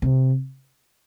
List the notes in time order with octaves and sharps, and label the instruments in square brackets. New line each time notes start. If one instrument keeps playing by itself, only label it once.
[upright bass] C3